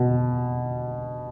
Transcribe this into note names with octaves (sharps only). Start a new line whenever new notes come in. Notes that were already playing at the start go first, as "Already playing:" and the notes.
Already playing: B2